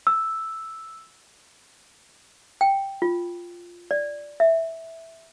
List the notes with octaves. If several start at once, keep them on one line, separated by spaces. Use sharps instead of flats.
E6
G5
F4
D5
E5